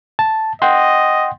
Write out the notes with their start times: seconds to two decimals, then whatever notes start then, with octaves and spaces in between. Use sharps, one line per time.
0.19 A5
0.62 D#5 F#5 G5 C6